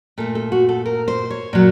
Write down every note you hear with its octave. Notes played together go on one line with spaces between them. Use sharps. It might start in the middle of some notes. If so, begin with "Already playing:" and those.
A#2 A3 A4
A4
F#4
A4
A#4
C5
C#5
A#2 F#3